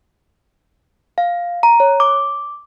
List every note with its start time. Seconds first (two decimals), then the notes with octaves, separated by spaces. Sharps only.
1.18 F5
1.63 A#5
1.80 C#5
2.00 D6